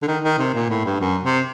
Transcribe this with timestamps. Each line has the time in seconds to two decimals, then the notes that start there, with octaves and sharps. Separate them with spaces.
0.02 D3
0.07 D#3
0.23 D#3
0.39 C3
0.54 A#2
0.70 A2
0.85 G2
1.00 F#2
1.24 C3